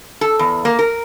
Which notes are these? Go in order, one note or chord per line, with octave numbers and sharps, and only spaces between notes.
A4
E2
A#3
A#4